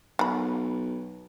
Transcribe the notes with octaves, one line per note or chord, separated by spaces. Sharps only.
B1 F#3 B5